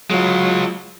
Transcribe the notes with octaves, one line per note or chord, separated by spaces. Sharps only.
F#3 G#3 F4